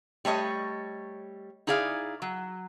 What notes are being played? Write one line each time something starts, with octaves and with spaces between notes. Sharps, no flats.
G3 A3 C#5 D#5
D#4 E4 G#4 D5 F5
F#3